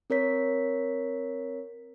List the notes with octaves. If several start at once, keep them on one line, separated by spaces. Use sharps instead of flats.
C4 A#4 C#5 B6